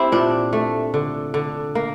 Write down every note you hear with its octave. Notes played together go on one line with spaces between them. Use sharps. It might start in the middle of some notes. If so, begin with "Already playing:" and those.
Already playing: C4 E4 G4
A#2 D4
A3
D3
D3
A#3